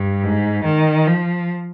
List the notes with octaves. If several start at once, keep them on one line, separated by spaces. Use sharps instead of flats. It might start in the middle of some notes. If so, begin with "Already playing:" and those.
Already playing: G2
G#2
D#3
F3